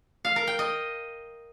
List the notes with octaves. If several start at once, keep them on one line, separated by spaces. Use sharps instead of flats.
F5
A#4
G5
D#5